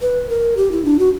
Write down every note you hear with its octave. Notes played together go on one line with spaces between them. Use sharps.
B4
A#4
G4
E4
D4
F#4